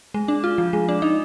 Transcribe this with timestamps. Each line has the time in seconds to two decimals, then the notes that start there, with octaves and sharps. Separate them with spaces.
0.14 G#3
0.28 D4
0.44 F4
0.58 F3
0.73 G#3
0.89 D4
1.02 D#4